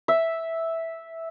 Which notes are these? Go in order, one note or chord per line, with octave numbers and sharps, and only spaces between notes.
E5